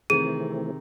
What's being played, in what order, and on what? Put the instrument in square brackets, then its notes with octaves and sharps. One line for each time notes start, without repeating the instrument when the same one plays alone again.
[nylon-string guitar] C3 D#3 [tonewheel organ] E3 A3 C4 [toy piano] G#4 [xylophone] D#7